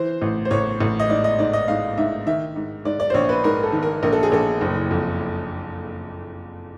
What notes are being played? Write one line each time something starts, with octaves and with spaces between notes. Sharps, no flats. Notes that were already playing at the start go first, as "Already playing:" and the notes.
Already playing: E3 C5
A1
C5
A1 C#5
A1
D#5
G#2 D5
D#5
G#2 D5
D#5
G#2 F5
G#2 E5
D#3 E5
G#2
G#2 D5
D5
C5
A#1 C#5
B4
G#2 A#4
A4
D#3
A#4
A#1 A#4
A4
G#4
A#1 A4
F#1
F2